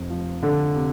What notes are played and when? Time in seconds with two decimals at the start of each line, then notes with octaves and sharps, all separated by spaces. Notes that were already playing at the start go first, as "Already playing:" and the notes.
Already playing: F1 F2 C3
0.10 F3
0.43 F1 D3
0.76 C3